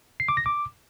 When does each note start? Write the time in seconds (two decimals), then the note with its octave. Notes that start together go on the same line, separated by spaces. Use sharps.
0.20 C7
0.28 D6
0.37 A#6
0.46 D6